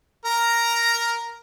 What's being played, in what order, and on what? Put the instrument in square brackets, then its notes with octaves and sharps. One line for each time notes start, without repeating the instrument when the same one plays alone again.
[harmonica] A#4 A#5